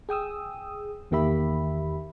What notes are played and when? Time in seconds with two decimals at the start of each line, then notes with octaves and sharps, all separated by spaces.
0.09 G#4 G5 D#6 E6
1.11 E2 D#3 A#3 G4 E5 B5